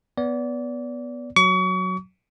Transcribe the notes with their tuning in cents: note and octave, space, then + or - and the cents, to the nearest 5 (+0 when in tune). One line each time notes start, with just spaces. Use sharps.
B3 +0 D5 -25
F#3 +0 C#6 +35